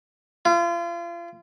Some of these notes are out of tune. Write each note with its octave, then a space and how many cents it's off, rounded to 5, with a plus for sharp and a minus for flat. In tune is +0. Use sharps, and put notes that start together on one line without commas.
F4 -35